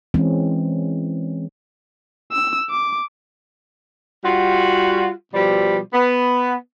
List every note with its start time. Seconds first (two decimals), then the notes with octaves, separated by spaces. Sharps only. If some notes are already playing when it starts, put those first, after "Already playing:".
0.14 E3 G#3 C4 C#4
2.32 E6
2.70 D6
4.25 G3 F4 F#4
5.34 B2 F3 G3
5.93 B3